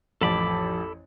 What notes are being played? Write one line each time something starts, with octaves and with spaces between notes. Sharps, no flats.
A1 F2 A4 A5 B5 D6